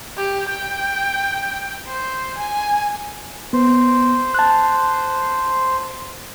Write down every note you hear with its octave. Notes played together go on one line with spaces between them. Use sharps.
G4
G5
C5
G#5
B3 C5
A5 F#6